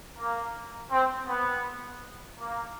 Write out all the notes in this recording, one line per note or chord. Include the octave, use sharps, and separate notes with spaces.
A#3
C4
B3
A#3